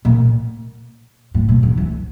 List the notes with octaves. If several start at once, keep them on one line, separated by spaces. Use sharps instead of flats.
A#2
A2
A#2
D3
E3